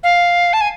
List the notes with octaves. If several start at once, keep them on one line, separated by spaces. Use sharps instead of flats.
F5
A5
G#5